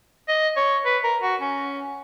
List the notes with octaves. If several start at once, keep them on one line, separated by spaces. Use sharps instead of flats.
D#5
C#5
B4
A#4
F#4
C#4